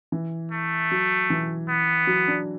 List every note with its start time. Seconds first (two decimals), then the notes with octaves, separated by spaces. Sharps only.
0.12 E3
0.51 A3
0.91 F#3
1.30 E3
1.68 B3
2.07 F#3
2.28 D4